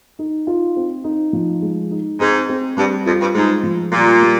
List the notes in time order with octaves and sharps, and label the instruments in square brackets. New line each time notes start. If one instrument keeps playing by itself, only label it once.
[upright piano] D#4
F4
C4
D#4
F3
G#3
D#4
[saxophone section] G#2 [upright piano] C4
[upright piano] C4
[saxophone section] G2 [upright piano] G3
[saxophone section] F2 [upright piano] F4
[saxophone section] G2
[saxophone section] G#2 [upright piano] G#3
[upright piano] F3
[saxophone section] A#2 [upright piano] G3
[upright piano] G3